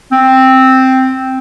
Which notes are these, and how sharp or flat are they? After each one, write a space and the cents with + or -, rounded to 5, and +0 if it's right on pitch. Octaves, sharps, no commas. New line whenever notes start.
C4 +0